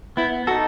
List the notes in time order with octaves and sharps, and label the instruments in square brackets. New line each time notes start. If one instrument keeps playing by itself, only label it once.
[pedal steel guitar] B3 [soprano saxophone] E4
[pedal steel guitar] D#4 A4 [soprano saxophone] F#4